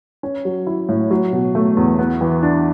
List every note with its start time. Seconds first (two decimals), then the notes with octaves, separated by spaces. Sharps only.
0.23 C#4
0.45 F#3
0.67 E4
0.89 A2
1.11 F#3
1.33 B2
1.55 A3
1.77 E2
1.99 B3
2.21 E3
2.43 D4